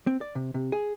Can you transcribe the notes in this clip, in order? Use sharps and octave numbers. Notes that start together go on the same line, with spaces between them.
C4
D5
C3
C3
G#4